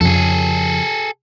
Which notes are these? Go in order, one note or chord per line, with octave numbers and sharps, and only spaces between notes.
F2 C#3 G#4 A4